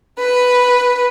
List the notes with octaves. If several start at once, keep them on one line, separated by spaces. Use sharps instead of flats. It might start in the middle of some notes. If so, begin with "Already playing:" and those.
B4